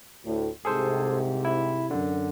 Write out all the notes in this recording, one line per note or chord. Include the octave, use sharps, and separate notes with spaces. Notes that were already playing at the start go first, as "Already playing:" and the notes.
D2 A2
C2 G#2 C3 G#4 A4 C5
E4
F#2 D3